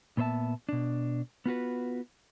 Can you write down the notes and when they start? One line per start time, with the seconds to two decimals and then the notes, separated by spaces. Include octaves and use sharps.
0.17 A#2 B3 C5 E5 A5
0.69 B2 D4
1.46 B3 F4 F#4 B4